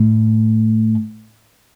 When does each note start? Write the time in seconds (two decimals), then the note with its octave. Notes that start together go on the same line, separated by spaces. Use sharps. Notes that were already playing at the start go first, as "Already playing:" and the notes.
Already playing: A2